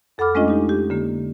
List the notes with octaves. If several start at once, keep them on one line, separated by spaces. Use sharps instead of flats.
F2 A4 F#5 B5 D6 F6
G#3 A3 C#4 D4 F4 D#5
D#4 G4
G4
D3 A#3